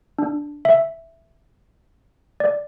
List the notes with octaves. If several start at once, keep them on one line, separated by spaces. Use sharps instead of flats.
D4
E5
D5